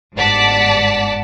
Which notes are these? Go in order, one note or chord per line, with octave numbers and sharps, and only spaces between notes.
G1 G#2 D5 F#5 A5 B6